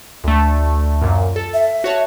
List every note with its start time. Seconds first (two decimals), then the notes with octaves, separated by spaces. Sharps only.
0.24 D2 A3
1.02 F#2 A#2
1.36 A4
1.54 E5
1.84 F#4 C#5 A5